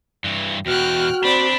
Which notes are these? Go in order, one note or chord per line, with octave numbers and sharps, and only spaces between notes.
G2 E3
E2 B2 F#4 G5 F6 F#6
C4 D4 C5 D5 B5